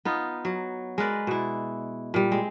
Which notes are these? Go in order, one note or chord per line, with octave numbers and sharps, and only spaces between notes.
B3 D#4 F4
F#3
G#3 A#4 B4 D5
B2 E4
A#2 G3
G#3 C4